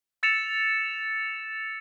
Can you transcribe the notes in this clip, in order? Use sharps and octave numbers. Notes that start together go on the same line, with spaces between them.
E6 A6 C#7 E7 F7